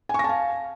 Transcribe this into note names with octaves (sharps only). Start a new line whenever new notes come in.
F5 G#5 A5 C#6 A#6